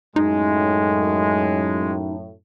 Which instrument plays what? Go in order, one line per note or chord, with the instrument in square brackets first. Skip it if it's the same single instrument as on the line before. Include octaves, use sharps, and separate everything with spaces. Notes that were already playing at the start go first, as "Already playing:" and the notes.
[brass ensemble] F#2 A2 [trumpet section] G#3 [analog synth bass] D#4